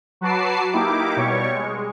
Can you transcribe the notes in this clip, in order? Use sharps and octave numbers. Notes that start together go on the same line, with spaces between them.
F#3 F#4 B4 A5 D6 C7
A#3 D#4 E4 G4 D6
B2 G3 C#5 C#6
G#3